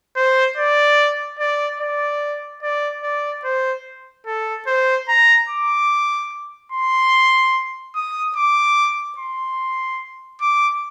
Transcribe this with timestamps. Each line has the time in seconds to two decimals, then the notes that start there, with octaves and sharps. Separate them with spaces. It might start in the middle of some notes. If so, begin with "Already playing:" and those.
0.16 C5
0.57 D5
1.39 D5
1.80 D5
2.63 D5
3.03 D5
3.44 C5
4.26 A4
4.67 C5
5.09 A#5
5.49 D6
6.72 C6
7.95 D#6
8.36 D6
9.18 C6
10.41 D6